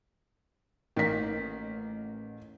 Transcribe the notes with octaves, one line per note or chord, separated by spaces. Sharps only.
A1 D#3 A#3 B6